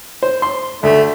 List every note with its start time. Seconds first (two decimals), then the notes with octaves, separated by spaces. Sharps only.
0.23 C5
0.42 C6
0.83 D2 A3